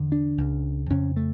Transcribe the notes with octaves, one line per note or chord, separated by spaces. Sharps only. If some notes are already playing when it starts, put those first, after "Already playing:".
Already playing: E2 D3
D4
C#2 C#3
F2 C#3 C#4
A3